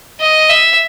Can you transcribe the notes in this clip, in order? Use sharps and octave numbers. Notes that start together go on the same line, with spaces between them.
D#5
E5